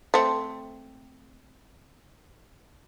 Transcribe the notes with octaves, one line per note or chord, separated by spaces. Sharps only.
A3 C4